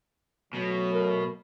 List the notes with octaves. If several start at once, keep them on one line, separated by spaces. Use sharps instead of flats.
B2 F#3 A3
A#4